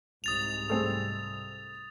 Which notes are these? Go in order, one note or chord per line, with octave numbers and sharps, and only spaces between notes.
C2 G#2 D#6 A6 F7
A3 C4 G#4